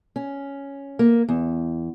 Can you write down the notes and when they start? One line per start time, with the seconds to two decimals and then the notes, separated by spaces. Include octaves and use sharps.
0.16 C#4
0.99 A#3
1.29 E2